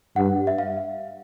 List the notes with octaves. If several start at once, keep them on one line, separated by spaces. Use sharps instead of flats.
G2 F#5
E5
F5